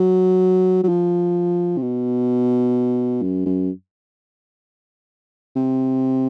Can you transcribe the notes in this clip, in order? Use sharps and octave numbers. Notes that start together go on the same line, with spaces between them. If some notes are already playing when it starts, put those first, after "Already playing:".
Already playing: F#3
F#3
F3
C3
B2
F#2
F#2
C3